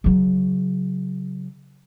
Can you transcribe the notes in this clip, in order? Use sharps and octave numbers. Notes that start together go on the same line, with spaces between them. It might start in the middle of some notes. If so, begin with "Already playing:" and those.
C#3 F#3